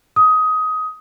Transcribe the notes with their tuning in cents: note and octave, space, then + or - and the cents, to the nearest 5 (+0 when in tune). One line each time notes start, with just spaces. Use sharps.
D#6 +15